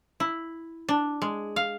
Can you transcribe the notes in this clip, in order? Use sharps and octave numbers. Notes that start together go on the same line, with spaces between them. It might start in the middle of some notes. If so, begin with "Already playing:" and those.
E4
D4
G#3
F5